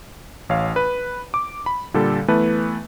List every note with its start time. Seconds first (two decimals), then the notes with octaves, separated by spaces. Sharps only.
0.49 A1 C#5 F5
0.76 B4
1.34 D6
1.66 B5
1.94 A#2 D3 G3 A4
2.28 E3 A3 B3 E4 B4 A5